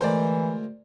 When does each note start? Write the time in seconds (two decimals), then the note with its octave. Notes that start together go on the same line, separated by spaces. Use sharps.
0.01 D2 E3 G#3 A#4 C5 D5